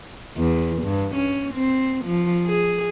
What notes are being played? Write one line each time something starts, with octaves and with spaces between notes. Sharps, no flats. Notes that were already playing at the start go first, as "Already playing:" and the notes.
E2
G2
C#4
C4
F3
G#4